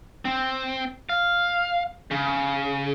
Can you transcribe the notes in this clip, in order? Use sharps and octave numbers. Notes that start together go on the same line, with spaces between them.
C4
F5
C#3